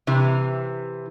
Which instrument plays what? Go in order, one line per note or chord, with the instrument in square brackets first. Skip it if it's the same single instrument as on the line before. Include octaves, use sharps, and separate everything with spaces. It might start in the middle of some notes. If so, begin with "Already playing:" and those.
[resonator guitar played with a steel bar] C3 E3